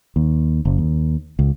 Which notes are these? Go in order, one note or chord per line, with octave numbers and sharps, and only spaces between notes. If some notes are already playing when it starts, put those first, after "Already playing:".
D#2
F#1
D#2
C#2